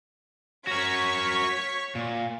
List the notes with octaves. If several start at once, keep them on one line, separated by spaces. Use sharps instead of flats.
F#4 A#4 C#5 C#6 B6
A#2